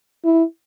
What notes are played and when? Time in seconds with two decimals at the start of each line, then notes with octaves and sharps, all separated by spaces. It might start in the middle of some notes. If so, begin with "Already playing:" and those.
0.25 E4